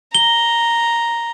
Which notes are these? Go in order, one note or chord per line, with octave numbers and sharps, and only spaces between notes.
A#5 G7